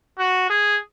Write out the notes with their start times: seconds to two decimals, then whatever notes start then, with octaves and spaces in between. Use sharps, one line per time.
0.19 F#4
0.50 G#4